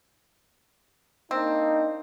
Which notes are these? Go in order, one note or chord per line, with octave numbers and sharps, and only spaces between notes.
A#3 C4 D4 D#4